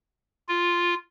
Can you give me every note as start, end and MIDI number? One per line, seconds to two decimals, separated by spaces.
0.48 0.94 65